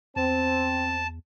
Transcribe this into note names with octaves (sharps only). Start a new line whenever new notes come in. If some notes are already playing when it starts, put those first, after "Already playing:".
E2 C4 A5